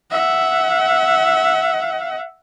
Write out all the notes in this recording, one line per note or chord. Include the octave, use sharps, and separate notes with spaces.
E5 F#5